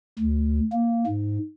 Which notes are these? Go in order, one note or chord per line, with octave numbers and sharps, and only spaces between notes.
D2
A#3
G#2